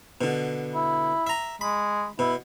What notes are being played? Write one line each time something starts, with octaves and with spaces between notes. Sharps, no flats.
B2 D3
E4
E5 A#5
G#3 B5
B2 E4